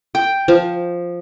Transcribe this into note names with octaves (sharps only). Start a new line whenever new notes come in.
G5
F3